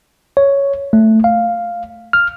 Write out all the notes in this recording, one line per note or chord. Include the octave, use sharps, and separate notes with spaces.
C#5
A3
F5
F6